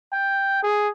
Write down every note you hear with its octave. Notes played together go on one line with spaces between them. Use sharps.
G5
G#4